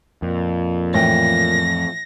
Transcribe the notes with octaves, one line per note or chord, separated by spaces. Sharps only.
F2 A#2
A2 E3 G5 A#6